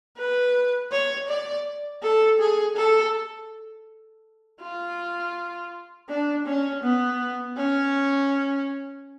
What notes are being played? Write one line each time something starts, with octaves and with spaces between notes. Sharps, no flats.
B4
C#5
D5
A4
G#4
A4
F4
D4
C#4
B3
C#4